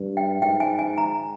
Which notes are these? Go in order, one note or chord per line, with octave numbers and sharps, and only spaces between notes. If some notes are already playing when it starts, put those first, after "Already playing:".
Already playing: G2
G5
G#2 G5
G#5
G#5
A#5